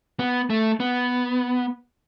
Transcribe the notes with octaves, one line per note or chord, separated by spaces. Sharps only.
B3
A3
B3